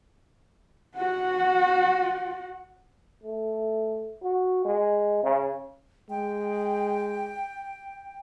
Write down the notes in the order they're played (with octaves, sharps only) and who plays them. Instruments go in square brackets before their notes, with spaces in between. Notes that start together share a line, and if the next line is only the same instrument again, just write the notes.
[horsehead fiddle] F#4 F#5
[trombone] A3
F#4
G#3
C#3
[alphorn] G#3 [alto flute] G5